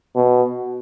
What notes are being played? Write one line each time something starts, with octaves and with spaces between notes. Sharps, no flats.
B2